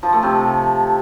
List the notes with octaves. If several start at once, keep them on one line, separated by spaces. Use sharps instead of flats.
F3
A3
C3